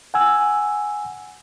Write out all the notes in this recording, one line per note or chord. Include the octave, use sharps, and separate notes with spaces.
F#5 G#5 E6